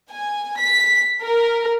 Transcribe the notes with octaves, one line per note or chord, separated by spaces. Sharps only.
G#5
B6
A#4